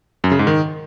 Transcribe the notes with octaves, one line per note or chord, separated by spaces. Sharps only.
F#2
C#3
G#2
D#3